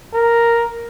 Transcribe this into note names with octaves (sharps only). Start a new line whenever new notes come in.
A#4